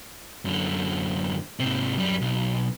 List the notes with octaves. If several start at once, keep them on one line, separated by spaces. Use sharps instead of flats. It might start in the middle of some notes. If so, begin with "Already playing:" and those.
F#2 D3
G#2 C3
F#2 G3
B1